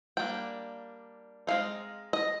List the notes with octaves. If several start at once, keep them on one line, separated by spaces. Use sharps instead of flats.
G3 A#3 D4 G5
G#3 C4 D#4 F5
D#5